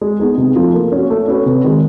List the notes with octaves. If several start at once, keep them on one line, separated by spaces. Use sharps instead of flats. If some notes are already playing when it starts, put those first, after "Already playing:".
G#3
B3 D#4 G#4
C3
F3 A3
A#3
C#4 F#4
A3
C#4 F#4 B4
C3
D#3 G#3